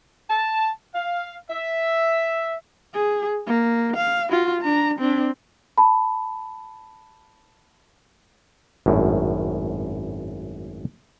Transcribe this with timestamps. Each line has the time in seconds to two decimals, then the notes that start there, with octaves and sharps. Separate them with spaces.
0.30 A5
0.94 F5
1.51 E5
2.94 G#4
3.47 A#3
3.96 F5
4.31 F4 F#4
4.61 D4 A#5
4.99 C4 D4
5.78 A5 B5
8.86 G#1 F#2 A2